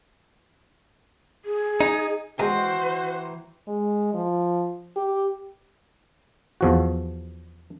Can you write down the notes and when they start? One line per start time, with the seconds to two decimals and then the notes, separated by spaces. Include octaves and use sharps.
1.45 G#4
1.81 D#4
2.39 E3 G#3 F#4 C5 G5 A#5
3.67 G#3
4.14 F3
4.96 G4
6.61 E2 F3 F#4